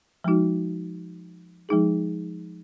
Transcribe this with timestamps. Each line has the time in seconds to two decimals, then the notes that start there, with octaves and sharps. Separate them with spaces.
0.24 F3 G#3 D#4 F#4
1.69 F3 G#3 D#4 G#4